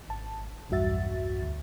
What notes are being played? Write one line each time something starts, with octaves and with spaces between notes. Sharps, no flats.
G#1 A5
B1 E2 G2 F#4 E5 A6
D2